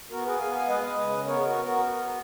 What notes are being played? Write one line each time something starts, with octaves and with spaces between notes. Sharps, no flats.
B3 F#4 A#4
G#4 B4
B3 F5 G#5
F5 G#5
G#3 B4 D#5
C#3
B3 A#4 C#5
F#4 A#4
B3
F#4 A#4